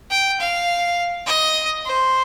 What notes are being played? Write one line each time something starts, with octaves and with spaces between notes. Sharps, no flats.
G5
F5
D#5
C5